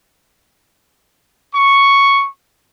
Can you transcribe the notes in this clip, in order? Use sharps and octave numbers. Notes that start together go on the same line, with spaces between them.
C#6